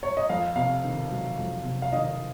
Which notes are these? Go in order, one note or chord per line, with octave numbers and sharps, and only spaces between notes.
C#5
D#5
F2 F5
C3 F5
D#3
F#3
F2
C3
F5
D#3 D#5